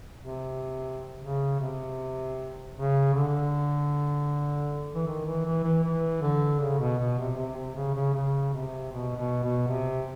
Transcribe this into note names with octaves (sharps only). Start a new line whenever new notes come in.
C3
C#3
C3
C#3
D3
E3
D#3
E3
E3
E3
E3
D3
C#3
B2
B2
C3
C3
C3
C#3
C#3
C#3
C3
B2
B2
B2
C3